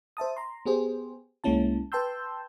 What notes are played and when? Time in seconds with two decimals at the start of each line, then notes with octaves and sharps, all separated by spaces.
0.17 C5 E5 A5 D#6
0.36 A#5 C6
0.66 B3 G4 G#4 C5
1.44 C2 G#3 A#3 C#4 E4 A5
1.92 B4 G5 A5 C6 E6 G6